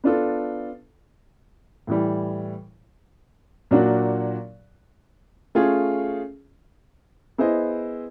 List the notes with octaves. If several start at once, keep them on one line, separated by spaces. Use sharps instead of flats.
B3 D4 F4 A4
A2 E3 G3
A#2 F#3 A#3 D4 F#4
A3 C#4 F4 G#4
B3 E4 G#4 C5 D#5